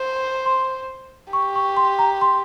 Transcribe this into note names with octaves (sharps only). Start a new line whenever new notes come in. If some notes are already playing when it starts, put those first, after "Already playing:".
Already playing: C5
C6
G4 C#6
C#6
C6
A#5
C6